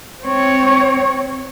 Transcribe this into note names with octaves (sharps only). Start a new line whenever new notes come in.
C4 C#5